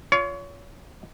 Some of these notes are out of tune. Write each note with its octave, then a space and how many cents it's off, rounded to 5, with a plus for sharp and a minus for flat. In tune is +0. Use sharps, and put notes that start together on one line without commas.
F4 +0 C#5 +30